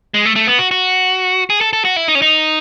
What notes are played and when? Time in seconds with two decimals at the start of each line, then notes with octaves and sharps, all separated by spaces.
0.14 G#3
0.25 A3
0.36 A3
0.47 B3
0.59 F#4
0.71 F#4
1.50 G#4
1.61 A4
1.73 A4
1.85 F#4
1.96 E4
2.08 D#4
2.15 C#4
2.22 D#4